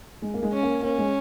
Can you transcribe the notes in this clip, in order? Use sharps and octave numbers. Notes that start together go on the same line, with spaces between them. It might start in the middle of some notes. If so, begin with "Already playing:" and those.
G#3
A#3
G#3
C#4
A#3
A#3 C#4
G#3